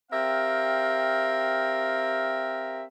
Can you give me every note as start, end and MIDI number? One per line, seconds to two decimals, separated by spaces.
0.12 2.84 60
0.12 2.84 67
0.12 2.84 70
0.12 2.84 76
0.12 2.84 77